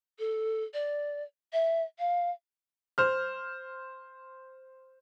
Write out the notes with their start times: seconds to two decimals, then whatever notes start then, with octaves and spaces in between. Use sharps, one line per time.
0.19 A4
0.74 D5
1.53 E5
1.99 F5
2.98 C5 F6